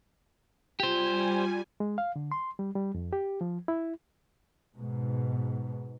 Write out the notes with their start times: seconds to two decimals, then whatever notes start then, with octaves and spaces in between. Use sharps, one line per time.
0.80 G3 F4 G4 C5 G#5
1.80 G#3
1.98 F5
2.16 D3
2.32 C6
2.59 G3
2.76 G3
2.95 F2
3.13 G4
3.41 F3
3.68 E4
4.77 G#2 B2